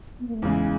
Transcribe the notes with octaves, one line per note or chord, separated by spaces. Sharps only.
B3
A#3
A3
E2 C#3 E3 G#3